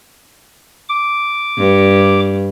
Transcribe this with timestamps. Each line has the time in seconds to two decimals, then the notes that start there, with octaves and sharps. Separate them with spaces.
0.89 D6
1.58 G2